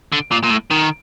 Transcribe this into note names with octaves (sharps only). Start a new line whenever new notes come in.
D3
A#2
A#2
A2
D#3